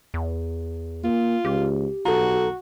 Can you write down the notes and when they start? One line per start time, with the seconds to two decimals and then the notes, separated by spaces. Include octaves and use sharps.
0.14 E2
1.04 A#3 F4
1.45 C#2 G4
2.05 B1 F#4 A4 A#5